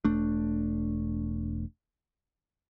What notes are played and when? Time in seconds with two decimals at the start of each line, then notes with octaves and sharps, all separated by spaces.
0.05 E1 A3 D4